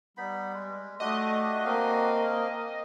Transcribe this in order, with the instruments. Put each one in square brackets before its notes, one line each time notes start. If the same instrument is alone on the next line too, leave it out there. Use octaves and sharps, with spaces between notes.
[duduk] G3 [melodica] B3 D#4 B5
[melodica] G#3
[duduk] A3 [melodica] D4 F#4 G4 [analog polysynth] D#5
[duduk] A#3 [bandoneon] C4 F5